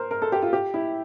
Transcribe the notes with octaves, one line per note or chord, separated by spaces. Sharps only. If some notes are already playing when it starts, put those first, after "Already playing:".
Already playing: A#4 C5
A#4
A4
G4
F4
G4
E4